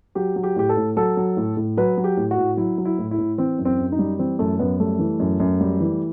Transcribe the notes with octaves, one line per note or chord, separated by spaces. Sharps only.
F#3 G4
F#3
G4
A2 G4
A4
A2
F#3 A4
F#3
A2
A2
F#3 B4
F#3
G4
A2
F#4
A2
F#3 E4
F#3
E4
A2
E4
A2
E3 C4
F#2
C4
F#2
D#4
G3
E3 C4
F#2 A3
F#2 B3
G3 A3
E3
F#2
F#2
G3
E3